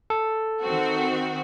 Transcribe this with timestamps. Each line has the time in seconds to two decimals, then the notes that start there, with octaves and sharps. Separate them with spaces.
0.10 A4
0.61 D#3 C4 F#4